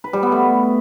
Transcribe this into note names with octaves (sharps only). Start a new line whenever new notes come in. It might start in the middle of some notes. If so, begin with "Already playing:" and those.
B4
G3
B3
A3